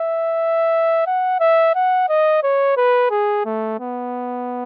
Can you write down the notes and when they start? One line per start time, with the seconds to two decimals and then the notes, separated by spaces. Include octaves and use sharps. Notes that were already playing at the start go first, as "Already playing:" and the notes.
Already playing: E5
1.07 F#5
1.40 E5
1.75 F#5
2.09 D#5
2.43 C#5
2.77 B4
3.11 G#4
3.45 A3
3.80 B3